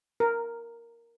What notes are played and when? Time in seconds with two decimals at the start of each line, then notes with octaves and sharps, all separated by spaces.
0.20 A#4